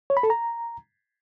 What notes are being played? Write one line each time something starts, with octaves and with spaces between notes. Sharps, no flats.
C#5
B5
A4
A#5